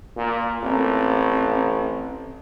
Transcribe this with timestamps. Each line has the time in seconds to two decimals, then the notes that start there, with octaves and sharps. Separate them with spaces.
0.17 A#2
0.63 A1 C4